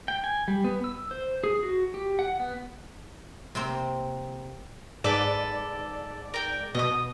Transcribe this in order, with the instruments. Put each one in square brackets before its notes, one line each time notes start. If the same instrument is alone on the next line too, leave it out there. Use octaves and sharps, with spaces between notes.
[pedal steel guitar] G5
G#5
G3
B3
E6
C5
G#4
F#4
G4
F#5
B3
[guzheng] C3 A#3 C4
[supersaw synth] G#2 D5 [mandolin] A4 B4
[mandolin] A#4 G5
[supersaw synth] B2 [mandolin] D#5 D#6